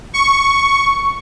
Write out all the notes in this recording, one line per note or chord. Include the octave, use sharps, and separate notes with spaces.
C#6